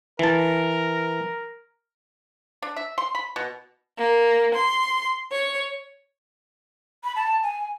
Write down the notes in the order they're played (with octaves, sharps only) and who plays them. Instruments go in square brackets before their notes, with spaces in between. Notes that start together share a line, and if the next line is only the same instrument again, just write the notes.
[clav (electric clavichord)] E3 A5 [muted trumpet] A#4
[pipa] D4
E5
C6
B5
B2
[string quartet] A#3
C6
C#5
[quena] B5
A5
G#5